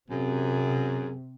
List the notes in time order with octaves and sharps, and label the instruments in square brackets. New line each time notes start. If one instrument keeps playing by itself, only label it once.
[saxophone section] F#2 G#4 [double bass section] C3